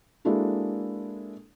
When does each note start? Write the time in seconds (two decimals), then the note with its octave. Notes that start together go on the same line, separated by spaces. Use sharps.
0.25 G#3 A#3 D4 E4 F#4 A4